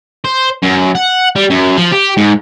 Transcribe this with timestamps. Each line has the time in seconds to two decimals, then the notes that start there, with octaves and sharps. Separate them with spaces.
0.25 C5
0.63 F#2
0.95 F#5
1.36 G3
1.50 F#2
1.77 F3
1.92 G4
2.17 G#2